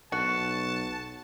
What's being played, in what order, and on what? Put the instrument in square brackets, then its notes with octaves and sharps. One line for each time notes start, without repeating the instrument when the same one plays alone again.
[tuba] B1 [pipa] F#4 [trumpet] A5 [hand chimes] F#6 C#7